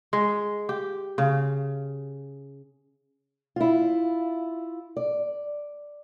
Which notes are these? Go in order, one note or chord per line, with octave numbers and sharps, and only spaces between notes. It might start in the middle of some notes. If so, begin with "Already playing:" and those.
G#3
G4
C#3
E4 F4
D5